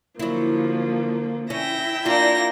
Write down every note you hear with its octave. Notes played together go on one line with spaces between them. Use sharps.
D3 F3 F#3 A#3 E4
C#4 E4 E5 G5 A#6
A#3 D4 F4 A#6